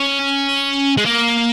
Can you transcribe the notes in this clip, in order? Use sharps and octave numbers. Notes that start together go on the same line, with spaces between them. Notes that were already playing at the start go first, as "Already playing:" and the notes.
Already playing: C#4
G#3
A#3